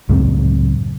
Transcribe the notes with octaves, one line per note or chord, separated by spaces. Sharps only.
C#2 F#2 A2 C4